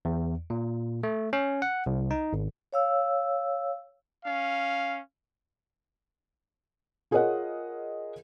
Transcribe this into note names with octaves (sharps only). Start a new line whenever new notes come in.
E2
A#2
A3
C#4
F#5
C2
D#4
G#1
C#5 F5 E6
C#4 F5
F4 G#4 A#4 C#5 D#5 F#5